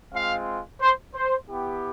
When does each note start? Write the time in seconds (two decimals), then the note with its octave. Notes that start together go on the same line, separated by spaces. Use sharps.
0.14 G#3 C4 F4 F5
0.80 C5
1.14 C5
1.48 B3 E4 G4